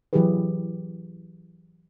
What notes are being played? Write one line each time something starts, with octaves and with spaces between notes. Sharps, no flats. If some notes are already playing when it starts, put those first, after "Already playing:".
E3 F#3 E4 G4 G#4 B4